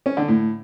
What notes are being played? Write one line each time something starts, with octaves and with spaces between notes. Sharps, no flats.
C#4
D3
A2